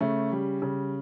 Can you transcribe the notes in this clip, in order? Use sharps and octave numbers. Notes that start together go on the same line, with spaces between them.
C#3 A3
G3
C#3